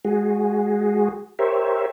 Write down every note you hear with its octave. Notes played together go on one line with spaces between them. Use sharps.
G#3 F#4 G#4
G4 A#4 C5 C#5 E5